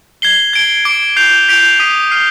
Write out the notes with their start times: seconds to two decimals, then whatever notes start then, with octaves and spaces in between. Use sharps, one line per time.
0.22 G#6 C7 G7
0.53 G#6 D7 G7
0.85 D6 G#6 D7
1.16 G6 C7 F7
1.49 G6 B6 D7 F7
1.80 D#6 B6 D#7
2.11 F6 C7 D#7 G7